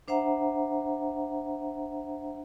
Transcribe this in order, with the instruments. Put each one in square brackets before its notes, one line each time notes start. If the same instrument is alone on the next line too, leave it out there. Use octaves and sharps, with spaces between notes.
[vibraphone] D4 C5 E5 F#5 A#5